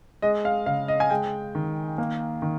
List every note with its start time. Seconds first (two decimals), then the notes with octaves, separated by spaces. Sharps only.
0.22 G#3 D#5
0.45 F5
0.66 C#3 F5
0.88 D#5
1.00 G#5
1.10 G#3 G5
1.55 D#3
1.98 A#3
2.42 D#3